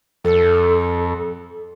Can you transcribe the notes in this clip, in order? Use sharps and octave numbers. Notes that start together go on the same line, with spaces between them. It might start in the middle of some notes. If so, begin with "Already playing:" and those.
F2 A4